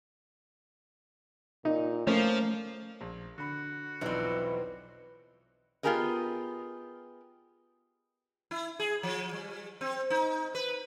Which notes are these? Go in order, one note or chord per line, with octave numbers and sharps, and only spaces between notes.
A#2 D#4
F3 A3 A#3 C#4
A#1
D3 F#4 B5
B1 E2 B2 F3 C4 D#4 E4 D5
B3 F4 G4 G#4 A#4 D#5
E4
G#4
F3
G3
C4
D#4
B4